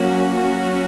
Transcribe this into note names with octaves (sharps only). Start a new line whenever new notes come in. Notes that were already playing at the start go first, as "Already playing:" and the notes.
Already playing: F#3 A#3 C#4 F#4
F#3 C#4 F#4